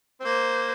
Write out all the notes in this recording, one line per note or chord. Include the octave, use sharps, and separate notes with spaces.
C4
A#3 C5